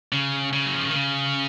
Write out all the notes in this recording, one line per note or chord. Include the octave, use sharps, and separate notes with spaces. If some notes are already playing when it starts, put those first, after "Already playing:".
C#3
C#3
F#3
F3
D#3
C#3